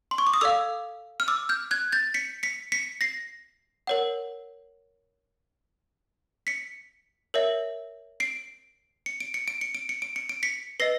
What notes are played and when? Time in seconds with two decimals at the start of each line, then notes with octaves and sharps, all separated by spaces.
0.11 C6
0.18 C#6
0.27 D6
0.34 D#6
0.41 A4 D5 F5 D6 E6
1.20 F6
1.28 D6 E6
1.49 F6 G6
1.71 F#6 G#6
1.92 G6 A6
2.14 B6 C#7
2.43 B6 C#7
2.72 B6 C#7
3.01 A#6 C7
3.87 A#4 C#5 F#5
6.47 B6 C#7
7.34 A#4 C#5 E5
8.20 C7 D7
9.06 C#7
9.20 D7
9.34 C#7
9.48 D7
9.61 C#7
9.75 D7
9.89 C#7
10.02 D7
10.16 C#7
10.29 D7
10.43 B6 C#7
10.80 B4 D#5 A#6 C7